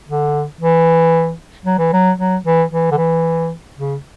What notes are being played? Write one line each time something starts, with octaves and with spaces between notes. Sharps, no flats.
D3
E3
F#3
E3
F#3
F#3
E3
E3
D3
E3
C#3